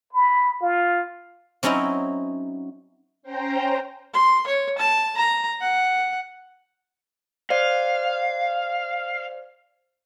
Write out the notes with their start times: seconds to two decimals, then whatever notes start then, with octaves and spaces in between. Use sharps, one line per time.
0.13 B5
0.62 F4
1.63 F#3 C4 C#4 D#4 E4
3.22 C#4 C5 G5 A#5
4.14 C6
4.47 C#5
4.78 A5
5.17 A#5
5.61 F#5
7.50 C5 D5 F5